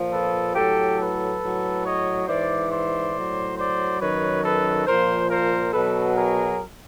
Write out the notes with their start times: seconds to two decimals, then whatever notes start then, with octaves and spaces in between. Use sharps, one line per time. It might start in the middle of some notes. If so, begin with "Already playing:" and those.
Already playing: A#2 F3
0.12 A4 B4
0.56 A2 F#3 G4 A4
0.99 A4 B4
1.42 A2 F#3
1.85 C#5 D#5
2.28 G#2 E3 C5 D5
2.72 C5 D5
3.15 A2 F#3
3.58 C5 D5
4.01 F#2 D#3 F#3 B4 C#5
4.44 A4 B4
4.87 A#2 F3 A#4 C5
5.30 A#4 C5
5.74 B2 F#3 A4 B4
6.16 G#4 A#4